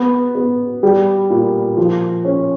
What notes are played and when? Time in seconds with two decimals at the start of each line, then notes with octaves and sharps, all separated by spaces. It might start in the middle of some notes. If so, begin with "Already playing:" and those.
Already playing: B3
0.35 B3
0.83 G3
1.30 A#2
1.77 F3
2.25 C#4